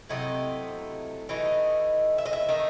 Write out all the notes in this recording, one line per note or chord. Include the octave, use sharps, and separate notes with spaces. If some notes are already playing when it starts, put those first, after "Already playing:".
C3 F#3 A3 E4 D#5
E3 A3 D#4 D#5
E5
D#5
E5
D#3 A3 D#4